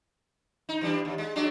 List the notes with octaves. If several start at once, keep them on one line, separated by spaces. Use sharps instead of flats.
D#4
E3 G3 D4
D#2
G#3
F#3 G#3 D4